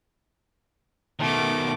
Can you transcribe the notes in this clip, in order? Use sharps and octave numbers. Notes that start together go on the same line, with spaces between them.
B2 D#3 A3 D6